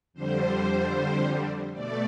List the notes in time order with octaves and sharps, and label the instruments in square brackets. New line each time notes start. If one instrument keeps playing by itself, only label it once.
[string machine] F2 D3 G3 C5
B2 A3 D5